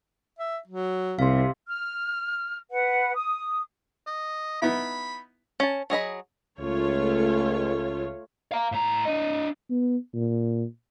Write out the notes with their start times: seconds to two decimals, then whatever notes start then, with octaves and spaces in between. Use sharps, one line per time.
0.39 E5
0.67 F#3
1.19 C2 C3 F5 C6
1.66 F6
2.69 B4 F#5
3.14 D#6
4.07 D#5
4.62 B3 D#4 E4 B5
5.60 C#4 A5
5.90 F#3 G#4 D#5 B5
6.60 C#2 A3 F4 C#5
8.52 F5 A#5
8.72 A2 A#5
9.05 D4 D#5
9.70 B3
10.14 A#2